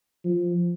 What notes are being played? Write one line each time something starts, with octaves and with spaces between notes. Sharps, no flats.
F3